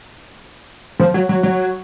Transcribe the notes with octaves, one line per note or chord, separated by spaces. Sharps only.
F3
F#3
F#3
F#3